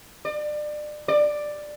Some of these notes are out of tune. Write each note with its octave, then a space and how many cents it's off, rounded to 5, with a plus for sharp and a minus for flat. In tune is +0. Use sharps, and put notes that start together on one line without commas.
D5 +30
D5 +10